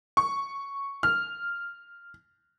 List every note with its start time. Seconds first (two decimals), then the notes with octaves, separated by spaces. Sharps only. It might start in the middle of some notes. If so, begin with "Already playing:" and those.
0.17 C#6
1.03 F6